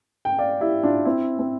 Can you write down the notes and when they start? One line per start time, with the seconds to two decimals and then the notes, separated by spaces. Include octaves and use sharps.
0.25 G5
0.38 D5 F5
0.61 E4 G4
0.83 D4 F4
1.05 C4 E4
1.39 C4